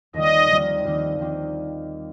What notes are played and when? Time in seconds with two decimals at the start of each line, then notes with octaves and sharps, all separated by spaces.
0.14 D#2 D#3 G3 C4 F4 D#5
0.50 D#2 D#3 G3 C4 F4
0.84 D#2 D#3 G3 C4 F4
1.18 D#2 D#3 G3 C4 F4